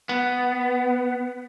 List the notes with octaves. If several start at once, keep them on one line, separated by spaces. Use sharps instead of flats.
B3